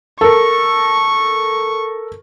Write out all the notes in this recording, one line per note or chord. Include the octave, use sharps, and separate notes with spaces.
A4 A#4 C#6